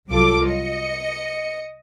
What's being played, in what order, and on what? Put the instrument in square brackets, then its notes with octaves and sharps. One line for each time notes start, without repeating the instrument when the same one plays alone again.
[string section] C2 F#3 F4 A4 D6
D#5 C#7